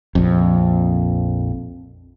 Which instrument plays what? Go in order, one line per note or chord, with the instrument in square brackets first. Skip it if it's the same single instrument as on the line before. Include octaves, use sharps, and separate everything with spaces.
[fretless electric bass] A#1 F2